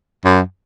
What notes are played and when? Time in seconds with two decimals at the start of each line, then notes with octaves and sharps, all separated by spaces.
0.24 F#2